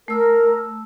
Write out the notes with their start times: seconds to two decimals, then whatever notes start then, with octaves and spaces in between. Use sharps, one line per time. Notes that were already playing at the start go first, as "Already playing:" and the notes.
0.08 A3 A#4 E6